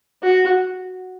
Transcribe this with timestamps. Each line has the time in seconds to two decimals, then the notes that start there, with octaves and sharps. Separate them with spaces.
0.23 F#4